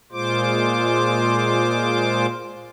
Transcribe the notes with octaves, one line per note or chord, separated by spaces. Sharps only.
A#2 G#3 F4 C5 D6